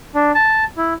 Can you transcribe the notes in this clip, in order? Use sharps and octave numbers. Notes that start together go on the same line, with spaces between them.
D4
A5
E4